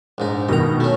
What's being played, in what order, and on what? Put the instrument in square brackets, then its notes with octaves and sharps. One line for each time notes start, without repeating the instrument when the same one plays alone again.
[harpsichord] A#1 G#2 D#4
[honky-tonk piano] B2 D#3 [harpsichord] D#5 A#5
[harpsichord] A3 C#4